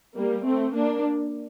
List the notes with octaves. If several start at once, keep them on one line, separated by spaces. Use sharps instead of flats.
G3 A#3
A3 C4
A#3 D4